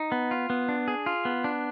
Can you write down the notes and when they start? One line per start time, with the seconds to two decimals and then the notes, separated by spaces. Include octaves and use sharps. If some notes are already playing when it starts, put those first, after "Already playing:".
Already playing: D#4
0.12 B3
0.31 F4
0.50 B3
0.69 D4
0.88 G#4
1.06 F4
1.25 B3
1.44 D4